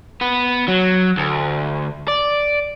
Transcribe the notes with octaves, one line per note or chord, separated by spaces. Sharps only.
B3
F#3
D2
D5